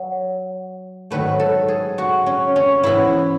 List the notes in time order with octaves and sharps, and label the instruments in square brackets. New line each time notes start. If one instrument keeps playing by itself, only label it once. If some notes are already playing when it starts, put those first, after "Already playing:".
Already playing: [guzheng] F#3
G#2 D#3 F#3 A3 B4
A4
G#4
F#4
C#4
C#4
G#2 E3 B3 E4